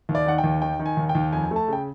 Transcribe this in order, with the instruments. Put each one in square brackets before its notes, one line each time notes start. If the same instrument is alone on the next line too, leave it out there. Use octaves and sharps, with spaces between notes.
[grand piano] D#2
D5
D#3 F#5
G5
D#2
D#3 G5
D#3
G#5
D#2
G5
D#2
F2 G#5
A3
A5
C#3 G5